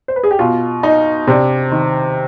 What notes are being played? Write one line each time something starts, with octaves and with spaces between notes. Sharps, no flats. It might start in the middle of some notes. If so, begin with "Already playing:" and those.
C5
B4
G#4
G4
B2 F4
D#4
C3 D4
D#3 D#4